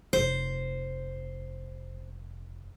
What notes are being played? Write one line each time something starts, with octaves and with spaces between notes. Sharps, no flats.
F1 C5